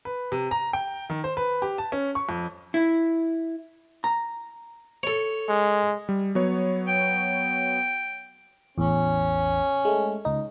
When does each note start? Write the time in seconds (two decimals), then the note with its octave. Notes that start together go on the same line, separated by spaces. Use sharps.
0.05 B4
0.32 C3
0.51 A#5
0.73 G5
1.10 D#3
1.24 C5
1.37 B4
1.62 G4
1.78 A5
1.92 C#4
2.15 C#6
2.29 F2
2.74 E4
4.04 A#5
5.03 A4 C#5
5.49 G#3
6.09 G3
6.35 F#3 B3 C#5
6.88 G5
8.78 A1 E2 C#4
9.85 G#3 A3
10.25 C#2 D#4